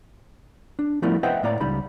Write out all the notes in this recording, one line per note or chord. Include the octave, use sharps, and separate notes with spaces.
D4
F3 G3 A3 B3 E4 A#4
B4 C5 D#5 E5 F#5 G5
A2 A#3 C#5 D5 A#5
C#2 G3 D#4 B5